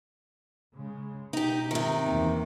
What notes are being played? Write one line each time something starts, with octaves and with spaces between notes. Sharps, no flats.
C#3 G#3
B2 D#4 G4
G#2 C3 D#3
E2 A#3 C4